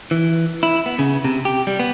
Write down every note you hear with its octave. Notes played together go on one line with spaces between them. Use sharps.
E3
E4
B3
C#3
C3
G4
G3
B3